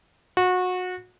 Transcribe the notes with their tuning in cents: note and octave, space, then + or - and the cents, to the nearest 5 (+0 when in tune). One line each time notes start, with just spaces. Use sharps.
F#4 -25